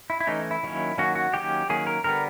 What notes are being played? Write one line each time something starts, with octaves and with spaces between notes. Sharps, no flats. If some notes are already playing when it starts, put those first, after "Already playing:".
E4
E4
E3 A3 C#4 D#4
E4
D#3 F#3 A#3 C#4
D#3 F#3 A#3 C#4 F#4
F#4
D#3 F#3 A#3 C#4 G4
D#3 F#3 A#3 C#4 G#4
A#4
D3 G3 B3 A#4